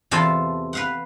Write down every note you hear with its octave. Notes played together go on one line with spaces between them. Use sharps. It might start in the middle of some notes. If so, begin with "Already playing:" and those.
E2 C3 F4 A4 A5
B4 F5 F#5